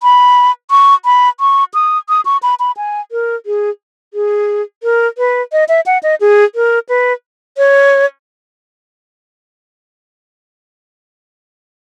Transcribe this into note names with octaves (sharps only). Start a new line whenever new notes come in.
B5
C#6
B5
C#6
D#6
D#6
C#6
B5
B5
G#5
A#4
G#4
G#4
A#4
B4
D#5
E5
F#5
D#5
G#4
A#4
B4
C#5